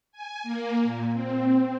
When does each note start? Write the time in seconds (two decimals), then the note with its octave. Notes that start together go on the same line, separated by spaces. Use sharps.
0.12 G#5
0.43 A#3
0.84 A#2
1.13 C4